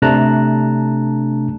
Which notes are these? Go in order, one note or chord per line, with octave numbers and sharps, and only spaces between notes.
C3 A3 D4 A5 A#5 F#6